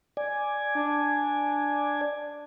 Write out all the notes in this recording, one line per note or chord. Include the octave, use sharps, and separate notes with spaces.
D5 G#5
D4